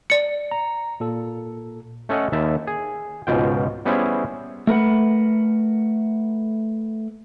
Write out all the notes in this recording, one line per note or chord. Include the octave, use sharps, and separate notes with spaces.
D5 C#7
A#5
A#2 A4
A3 C#4 A4 D#5 F#5
D#2 E5 A5
G#4
C#2 G#2 B2 F4 G5
G3 B3 C#4 E4 G#4 C5
A3 A#4 B4 F#5